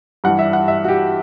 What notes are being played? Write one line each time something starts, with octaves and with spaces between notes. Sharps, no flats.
G2 E3 G3 F#5
E5
F#5
E5
F#4
G4